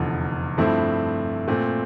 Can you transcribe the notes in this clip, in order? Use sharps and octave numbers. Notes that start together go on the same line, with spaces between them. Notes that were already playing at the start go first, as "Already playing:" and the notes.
Already playing: F1 E2 D3 F3
G2 F3 A3 C4 E4
A#2 A3 C4